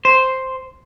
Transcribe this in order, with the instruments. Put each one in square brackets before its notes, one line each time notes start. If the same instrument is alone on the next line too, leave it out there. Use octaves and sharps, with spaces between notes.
[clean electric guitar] C5